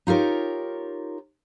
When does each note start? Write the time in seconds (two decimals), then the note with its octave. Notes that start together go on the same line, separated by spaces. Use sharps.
0.07 D#4 F4 G4 A#4 C#5